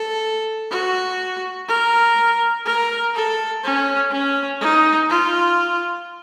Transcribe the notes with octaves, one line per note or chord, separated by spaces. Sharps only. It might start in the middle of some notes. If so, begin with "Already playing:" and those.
Already playing: A4
F#4
A#4
A#4
A4
C#4
C#4
D#4
F4